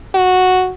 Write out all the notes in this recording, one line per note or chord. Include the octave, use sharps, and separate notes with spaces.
F#4